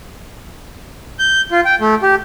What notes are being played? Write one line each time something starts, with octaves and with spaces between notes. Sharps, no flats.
G6
F4
G5
A3
G4